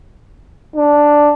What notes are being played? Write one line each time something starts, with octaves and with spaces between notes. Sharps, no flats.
D4